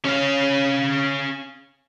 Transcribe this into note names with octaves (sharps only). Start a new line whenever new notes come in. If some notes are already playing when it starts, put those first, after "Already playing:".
C#4 F5